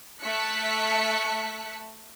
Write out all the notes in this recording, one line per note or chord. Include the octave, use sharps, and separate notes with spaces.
A3 E5 A5 F#6 B6 C#7